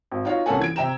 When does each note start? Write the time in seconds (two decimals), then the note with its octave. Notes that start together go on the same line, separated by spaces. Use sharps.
0.12 G#1
0.25 D#4 F4 F#4 C#5 F5
0.46 C2 A#3 C#4 A4 F#5 G#5
0.59 E3 G#6 D7
0.76 C3 E5 G5 A#5 E7